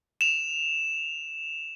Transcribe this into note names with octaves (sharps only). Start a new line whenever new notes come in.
E7 F7